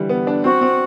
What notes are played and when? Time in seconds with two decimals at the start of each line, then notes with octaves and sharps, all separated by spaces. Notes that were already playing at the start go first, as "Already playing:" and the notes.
Already playing: D3 E3 G3
0.09 B3
0.27 D4
0.44 C4 F#4
0.61 C4